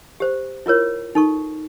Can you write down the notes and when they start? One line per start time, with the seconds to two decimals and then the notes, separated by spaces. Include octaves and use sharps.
0.20 G4 C5
0.66 E4 F4 A#4 C#5
1.15 D#4 A4 C#6